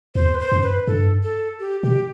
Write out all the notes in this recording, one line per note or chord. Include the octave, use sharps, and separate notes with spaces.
E2 C5
B4
C5
F#2
B4
G2 A4
A4
G4
B2 G4